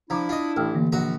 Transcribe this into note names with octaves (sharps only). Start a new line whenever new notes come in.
F3 D4 E4 A#5 D6
F4 D#5
A1 G5 E6 F6
D3 E3 A#3
A#1 F#4 A#5